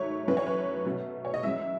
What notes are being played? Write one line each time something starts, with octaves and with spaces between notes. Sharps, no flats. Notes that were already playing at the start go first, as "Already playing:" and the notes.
Already playing: G#2 D#3 F#3 A3 C#5
F#2 E3 A3 B4
C#5
B4
B2 F#3 A3
C#5
D#5
F#2 E3 G#3 E5